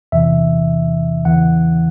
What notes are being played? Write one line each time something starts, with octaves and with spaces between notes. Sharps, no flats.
E2 C3 E3 E5
E2 C#3 E3 F#5